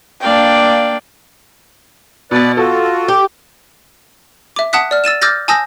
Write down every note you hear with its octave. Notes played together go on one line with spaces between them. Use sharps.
A#3 D4 D5 F5 G5
B2 B4 D5 A6
F4 F#4 A4
G4
E5 D6
F#5 A5 D#6 F#6 B6
D5 F6
E6 A6 D#7 E7
D6 E6 F6 G6 A6 A#6
G#5 A5 D#6 E6 G6 A#6